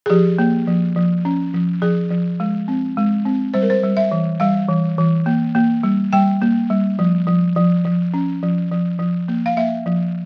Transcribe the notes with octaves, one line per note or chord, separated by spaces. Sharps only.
G#4
F3 G4
A#3
F3
F3
C#4
F3
F3 G#4
F3
G#3
C4
G#3
C4
G3 C5
A#4
C5
G3
E5
E3
G3 F5
E3
E3
A#3
A#3
G3
G3 G5
A#3
G3
F3
F3
F3
F3
C#4
F3
F3
F3
A#3
F5
A#3 E5
F3